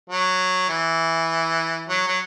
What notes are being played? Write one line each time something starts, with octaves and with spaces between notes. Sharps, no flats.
F#3
E3
F#3
F#3